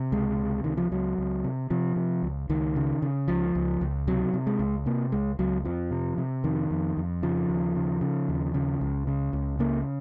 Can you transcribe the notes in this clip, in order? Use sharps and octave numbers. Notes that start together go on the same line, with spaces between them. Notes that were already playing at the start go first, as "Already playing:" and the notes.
Already playing: C3
C#2 G#3
C3
C#2 D#3
F3
C#2 F#3
C#2
C3
C3 F3
C3
C#2
C#2 D#3
C#3
C#3
C#2 F3
C#2
C#2
C3 F#3
C3
G#3
C#2
C3 A#3
C#2 G#3
C#2 F#3
F2 F3
C3
C3
F2 D#3
F2
F2
C#3 F3
D#2
C#3
C#3
D#2
C#3
C#2
C#3
C#2
C#3 A#3